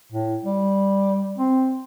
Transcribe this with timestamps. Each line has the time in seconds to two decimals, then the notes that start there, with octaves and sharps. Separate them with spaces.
0.12 A2
0.44 G3
1.38 C4